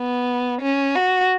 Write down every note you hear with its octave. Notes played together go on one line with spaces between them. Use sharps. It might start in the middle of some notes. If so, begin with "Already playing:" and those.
Already playing: B3
C#4
F#4